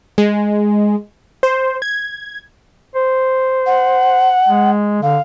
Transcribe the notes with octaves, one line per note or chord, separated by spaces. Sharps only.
G#3
C5
G#6
C5
F#5
G#3
D3 F5